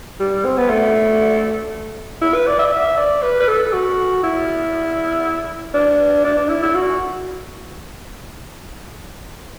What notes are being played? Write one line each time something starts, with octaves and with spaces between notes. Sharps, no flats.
G3
C4
B3
A3
E4
B4
D5
E5
D5
E5
D5
B4
B4
A4
F#4
E4
D4
D4
D4
E4
E4
F#4